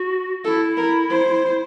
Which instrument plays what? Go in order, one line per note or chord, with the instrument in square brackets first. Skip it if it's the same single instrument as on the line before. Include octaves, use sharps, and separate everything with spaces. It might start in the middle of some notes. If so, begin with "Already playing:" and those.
Already playing: [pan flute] F#4
[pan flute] E4 [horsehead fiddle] A4
[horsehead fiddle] A#4
C5